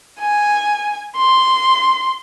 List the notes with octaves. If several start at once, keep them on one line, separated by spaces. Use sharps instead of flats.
G#5
C6